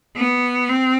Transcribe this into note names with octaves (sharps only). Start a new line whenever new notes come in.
B3
C4